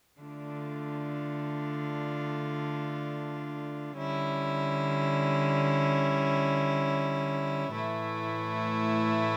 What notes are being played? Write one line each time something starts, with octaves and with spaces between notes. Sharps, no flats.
D3 A3 D4 F4
D3 G3 C#4 E4
A2 E3 A3 E4